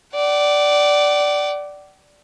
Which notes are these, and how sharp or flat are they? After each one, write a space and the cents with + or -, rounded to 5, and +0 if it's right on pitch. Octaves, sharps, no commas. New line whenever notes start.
D5 +0 F#5 +45